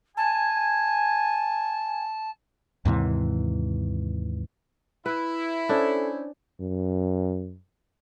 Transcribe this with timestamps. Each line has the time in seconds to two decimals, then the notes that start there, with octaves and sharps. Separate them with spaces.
0.17 G#5 A5
2.85 D#2 G#2 C3 E3
5.06 E4 B4
5.69 C#4 D4 A4 C5 C#5
6.61 F#2